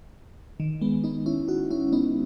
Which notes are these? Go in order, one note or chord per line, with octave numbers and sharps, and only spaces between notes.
D#3
G#3 B3
B3 D#4
C#4 E4
D#4 F#4
C#4 E4
B3 D#4